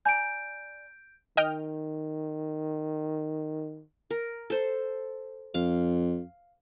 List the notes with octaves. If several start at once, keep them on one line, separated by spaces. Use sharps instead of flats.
D5 G#5 A#5 G6 D7
D#3 D#5 G5 F6
A#4
A4 C5
F2 F5